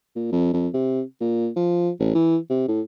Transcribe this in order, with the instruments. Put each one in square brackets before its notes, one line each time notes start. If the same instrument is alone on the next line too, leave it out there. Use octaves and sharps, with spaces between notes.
[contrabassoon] A#2
F2
F2
C3
A#2
F3
A1
E3
C3
A2